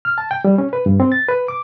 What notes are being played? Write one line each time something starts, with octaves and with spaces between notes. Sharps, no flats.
F6
A5
G5
G3
C#4
B4
G2
C4
A6
B4
D6